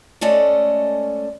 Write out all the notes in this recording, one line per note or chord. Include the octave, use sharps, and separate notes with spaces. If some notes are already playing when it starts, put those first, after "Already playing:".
G#3 A3 C#4 A4 D5 D#5